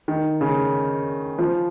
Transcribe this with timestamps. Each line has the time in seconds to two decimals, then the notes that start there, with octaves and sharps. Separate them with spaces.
0.08 D#3
0.41 C#3
1.39 F3